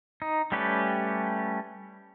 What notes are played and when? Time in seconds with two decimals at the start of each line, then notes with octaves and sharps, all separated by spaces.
0.22 D#4
0.52 G3 A3 C#4 G4 B4